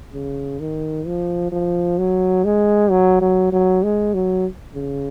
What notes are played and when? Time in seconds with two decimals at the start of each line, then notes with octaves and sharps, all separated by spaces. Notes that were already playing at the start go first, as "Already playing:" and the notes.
0.13 C#3
0.60 D#3
1.06 F3
1.52 F3
1.98 F#3
2.45 G#3
2.90 F#3
3.21 F#3
3.52 F#3
3.83 G#3
4.14 F#3
4.75 C#3